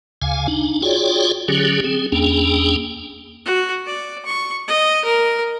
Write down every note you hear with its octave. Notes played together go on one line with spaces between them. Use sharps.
D2 C#3 F5 G#5
D4 D#4
F4 F#4 G#4 C#5 D5 G5
D3 F#3 C#4 G4 G#4
C4 G#4
E2 A#3 C#4 D4 G#4 G5
F#4
D5
C#6
D#5
A#4